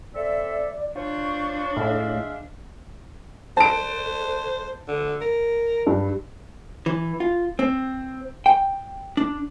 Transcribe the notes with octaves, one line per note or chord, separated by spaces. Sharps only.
C4 A4 D5 E5
D4 F4 C5 C#5 C#6
A2 G#3 E5 F5
C5 A5 D7
D3
A#4
G2
E3
F4
C4
G5
D4